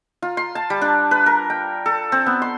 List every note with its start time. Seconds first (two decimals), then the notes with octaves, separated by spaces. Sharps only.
0.22 F4
0.37 C6
0.55 A5
0.70 G3
0.81 D4
1.11 B4
1.26 A#4
1.50 G5
1.86 A4
2.12 C4
2.26 B3
2.42 C6